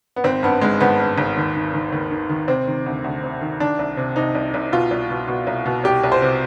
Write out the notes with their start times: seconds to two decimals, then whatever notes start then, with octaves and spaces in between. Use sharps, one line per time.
0.16 B3
0.24 G#1 C4
0.43 G2 B3
0.61 G#1 G#3
0.80 G#1 B3
1.00 G2
1.18 G#1
1.37 D#2
1.56 D#3
1.73 D#3
1.92 D#2
2.11 D#3
2.29 D#3
2.48 C3 C4
2.67 D#3
2.86 D2
3.04 D2
3.24 C3
3.41 D#3
3.60 D#3 D4
3.79 C2
3.97 C3
4.16 C3 D#4
4.35 C2
4.54 C2
4.72 B2 F4
4.91 C2
5.10 B2
5.28 B2
5.47 C2
5.66 B2
5.84 C2 G4
6.04 C2
6.12 C5
6.22 C3